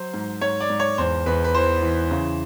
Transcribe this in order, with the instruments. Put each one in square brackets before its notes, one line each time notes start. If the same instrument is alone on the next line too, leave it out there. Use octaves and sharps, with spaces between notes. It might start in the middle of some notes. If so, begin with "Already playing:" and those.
Already playing: [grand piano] F#3 C5
G#2
G#2 C#5
D5
G#2
C#5
E2 C5
E2 B4
B4
E3 C5
E3
C#3